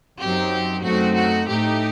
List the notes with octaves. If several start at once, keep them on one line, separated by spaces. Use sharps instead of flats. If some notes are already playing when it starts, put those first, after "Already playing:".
F#2 F#3 C4 D#4 G4
F#2 F#3 A3 C4 D#4 F#4
F#4
A2 A3 D#4 G4